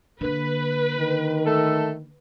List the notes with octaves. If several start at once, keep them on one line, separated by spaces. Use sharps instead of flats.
D3 A#3 B4
D#3
A3 A4